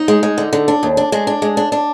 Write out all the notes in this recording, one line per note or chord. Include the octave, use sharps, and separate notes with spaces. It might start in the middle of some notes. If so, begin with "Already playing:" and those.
Already playing: D#4
G#3
G#3
D3
D3
D4
D#2
D4
G#3 D4
D4
G#3
D4
D4